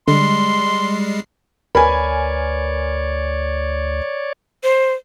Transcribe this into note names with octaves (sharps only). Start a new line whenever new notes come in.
D3 G3 G#3 C6 C7
D2 A#4 B4 C#5 D5 G#5 B5
C5